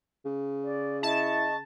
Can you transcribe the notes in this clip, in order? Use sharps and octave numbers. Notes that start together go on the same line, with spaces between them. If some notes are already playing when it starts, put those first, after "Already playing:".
C#3
D5
E4 D#5 A5 C#6